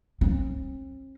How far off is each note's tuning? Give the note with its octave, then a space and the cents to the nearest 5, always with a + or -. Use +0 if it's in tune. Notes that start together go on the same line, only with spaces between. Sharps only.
C4 +45